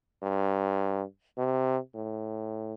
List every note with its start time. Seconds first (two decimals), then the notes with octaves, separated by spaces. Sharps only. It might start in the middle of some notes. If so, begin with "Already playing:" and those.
0.22 G2
1.38 C3
1.94 A2